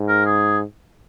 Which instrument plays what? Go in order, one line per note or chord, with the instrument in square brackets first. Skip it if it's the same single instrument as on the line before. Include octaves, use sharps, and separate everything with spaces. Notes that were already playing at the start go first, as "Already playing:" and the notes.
Already playing: [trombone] G#2
[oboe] A#4
G#4